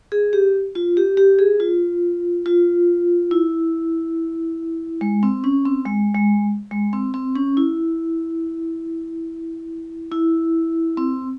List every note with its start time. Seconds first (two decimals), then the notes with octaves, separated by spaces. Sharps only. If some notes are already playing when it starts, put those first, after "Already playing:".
0.12 G#4
0.33 G4
0.75 F4
0.97 G4
1.17 G4
1.39 G#4
1.60 F4
2.46 F4
3.31 E4
5.01 G#3
5.23 C4
5.44 C#4
5.65 C4
5.86 G#3
6.15 G#3
6.71 G#3
6.93 C4
7.14 C4
7.36 C#4
7.57 E4
10.12 E4
10.97 C4